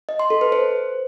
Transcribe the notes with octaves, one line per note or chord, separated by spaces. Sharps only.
D#5
C6
A4
B4
C5